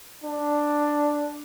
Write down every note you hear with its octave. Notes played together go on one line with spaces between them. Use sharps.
D4